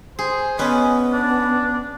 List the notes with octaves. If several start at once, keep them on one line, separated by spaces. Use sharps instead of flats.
G#4 C5
B3 C#4 B4 D#5
D4